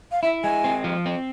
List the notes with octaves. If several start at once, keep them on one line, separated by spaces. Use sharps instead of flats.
F5
E4 E5
G#3 G#5
C4
F3
C4